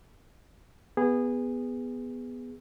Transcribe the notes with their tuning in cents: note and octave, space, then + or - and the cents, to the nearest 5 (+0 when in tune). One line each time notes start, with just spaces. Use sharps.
B3 +0 G#4 -20